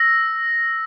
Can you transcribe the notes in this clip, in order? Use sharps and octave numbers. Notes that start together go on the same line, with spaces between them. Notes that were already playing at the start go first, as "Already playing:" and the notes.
Already playing: E6 A#6